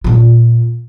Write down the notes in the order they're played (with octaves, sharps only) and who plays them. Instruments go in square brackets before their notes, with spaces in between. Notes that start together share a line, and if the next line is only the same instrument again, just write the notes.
[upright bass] A#2 F4